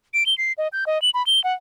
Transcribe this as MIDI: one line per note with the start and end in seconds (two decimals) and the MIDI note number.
0.14 0.26 98
0.26 0.37 103
0.38 0.53 96
0.58 0.68 75
0.73 0.84 91
0.87 1.01 75
1.02 1.10 102
1.14 1.25 83
1.27 1.42 103
1.44 1.54 78